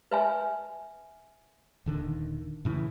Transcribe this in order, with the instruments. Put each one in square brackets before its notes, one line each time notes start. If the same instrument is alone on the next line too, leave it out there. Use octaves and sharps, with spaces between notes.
[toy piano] B4 E5 G#5
[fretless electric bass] D#1 D3 D#3
A2 C#3 E3